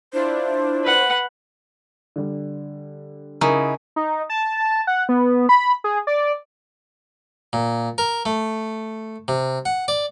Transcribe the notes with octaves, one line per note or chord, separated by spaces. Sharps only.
D4 E4 F4 C5
B4 F#5
D3 G3
C#3 D#4 E4 A#4
D#4
A5
F#5
B3
B5
G#4
D5
A#2
A#4
A3
C3
F#5
D5